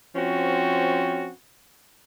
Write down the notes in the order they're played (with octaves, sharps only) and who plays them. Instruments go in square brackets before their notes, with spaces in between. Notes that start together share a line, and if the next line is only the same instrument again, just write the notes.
[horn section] F3 C4 C#4 F#4